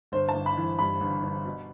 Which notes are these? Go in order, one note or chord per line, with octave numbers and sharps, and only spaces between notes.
G1 C5
A5
G1
B5
E3
G2 B5
G1
G1
B2